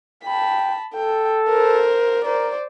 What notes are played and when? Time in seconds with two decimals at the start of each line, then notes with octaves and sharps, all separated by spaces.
0.24 G5 A5 B5
0.94 A4 G5
1.48 A#4 C5
2.25 A#4 C5 D5